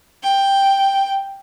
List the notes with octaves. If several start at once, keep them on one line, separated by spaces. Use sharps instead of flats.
G5